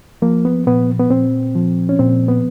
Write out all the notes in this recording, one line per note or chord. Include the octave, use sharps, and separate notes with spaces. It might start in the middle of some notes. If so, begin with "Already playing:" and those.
F3 A#3
B3
A#2 B3
B3
A#2 C4
F3
C#4
A#2 C4
B3